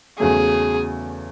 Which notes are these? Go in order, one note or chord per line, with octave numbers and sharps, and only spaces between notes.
E2 C#3 F#3 A3 G#4